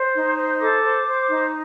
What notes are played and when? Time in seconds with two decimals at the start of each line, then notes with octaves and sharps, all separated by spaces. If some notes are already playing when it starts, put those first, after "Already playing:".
Already playing: C5
0.14 D#4
0.36 C5
0.59 A4 D6
0.82 C5
1.06 C5
1.28 D#4